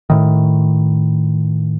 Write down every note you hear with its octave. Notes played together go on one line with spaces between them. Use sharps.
A2 D#3